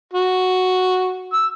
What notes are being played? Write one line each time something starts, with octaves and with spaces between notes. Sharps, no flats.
F#4
E6